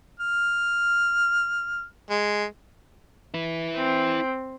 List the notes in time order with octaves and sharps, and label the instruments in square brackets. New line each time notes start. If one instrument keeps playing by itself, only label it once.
[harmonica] F6
G#3
[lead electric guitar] E4 B4
[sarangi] C4